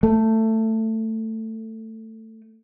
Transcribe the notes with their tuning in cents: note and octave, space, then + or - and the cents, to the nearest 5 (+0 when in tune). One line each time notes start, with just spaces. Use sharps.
A3 +15